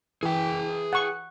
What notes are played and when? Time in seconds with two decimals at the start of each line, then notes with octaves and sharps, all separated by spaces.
0.23 E3 G#4 G5
0.93 F#5 C#6